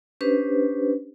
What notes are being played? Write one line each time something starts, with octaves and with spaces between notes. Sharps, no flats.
C#4 D4 G4 B4 C5